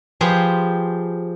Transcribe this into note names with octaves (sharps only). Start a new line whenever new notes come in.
F3 G4 G#4 B4 C5